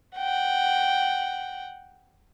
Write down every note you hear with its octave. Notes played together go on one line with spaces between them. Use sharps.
F#5 G5